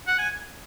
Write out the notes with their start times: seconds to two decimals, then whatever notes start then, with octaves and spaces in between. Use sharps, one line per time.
0.07 F#5
0.18 G#5